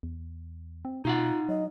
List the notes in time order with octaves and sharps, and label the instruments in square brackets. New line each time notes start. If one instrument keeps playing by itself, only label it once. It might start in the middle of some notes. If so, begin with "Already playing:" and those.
[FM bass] E2
C4
[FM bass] B2 [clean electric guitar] D#4 F5 F#5 [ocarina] F4
[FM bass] F#3 [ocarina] D#5